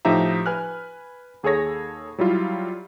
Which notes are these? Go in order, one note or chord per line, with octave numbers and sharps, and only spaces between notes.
A2 F3 D#4 G4 E5 A#5
B4 G#5 F6 F#6
D#2 G#4 A4 C#5 A#6
F#3 G3 E4 F4